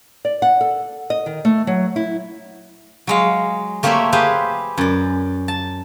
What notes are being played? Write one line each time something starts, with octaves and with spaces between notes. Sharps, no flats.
D5
F#5
A4
D#5
D#3
A3
F#3
E4
F#3 G#3 F5
A3 A#3 G4 C5 C#5 E5
G4 G#4 B4 C5 F5
F#2 D5
A5